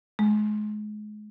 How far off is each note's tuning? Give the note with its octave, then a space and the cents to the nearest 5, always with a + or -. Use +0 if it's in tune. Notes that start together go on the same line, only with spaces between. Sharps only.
G#3 +30